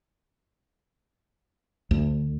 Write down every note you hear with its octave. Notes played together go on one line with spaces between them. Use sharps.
D2